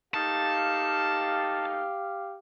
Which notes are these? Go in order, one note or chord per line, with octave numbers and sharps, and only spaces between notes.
A3 A#3 D#4 G4 F5 A5